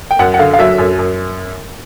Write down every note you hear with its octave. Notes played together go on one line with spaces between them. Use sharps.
G5
F#2 F#5
F#5
D3 F5
F5
F#3 E5
F#2
F#2